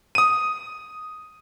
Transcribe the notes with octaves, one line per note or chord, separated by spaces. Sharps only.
D#6 D#7